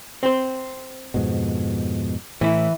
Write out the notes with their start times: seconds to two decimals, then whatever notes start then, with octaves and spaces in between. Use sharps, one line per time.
0.23 C4 C5
1.14 F2 G#2 B2
2.41 A2 E3 E4